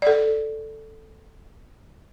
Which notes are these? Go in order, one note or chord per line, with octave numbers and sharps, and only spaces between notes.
A4 D5